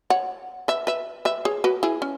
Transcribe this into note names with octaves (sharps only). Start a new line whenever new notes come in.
C#5 F#5
B4 E5
B4 E5
B4 E5
G#4 C#5
F#4 B4
E4 G#4
C#4